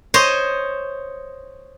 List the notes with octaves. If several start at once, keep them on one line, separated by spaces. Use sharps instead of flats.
C5 C#5 D#5